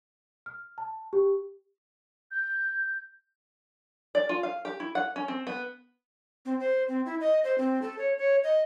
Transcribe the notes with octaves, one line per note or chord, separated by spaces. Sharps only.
F6
A5
G4
G6
D5
F4
F5
G4
E4
F#5
C#4
C4
B3
C4
C5
C4
E4
D#5
C5
C4
A4
C#5
C#5
D#5